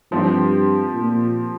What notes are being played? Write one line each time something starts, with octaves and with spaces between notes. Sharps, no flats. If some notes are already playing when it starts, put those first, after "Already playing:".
G2 F3 C4 G4
A#2